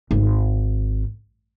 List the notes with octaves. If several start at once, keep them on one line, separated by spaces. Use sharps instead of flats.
G#1